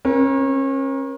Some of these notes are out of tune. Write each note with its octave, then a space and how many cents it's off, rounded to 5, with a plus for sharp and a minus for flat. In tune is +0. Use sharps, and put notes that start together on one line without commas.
C#4 -35 A#4 +35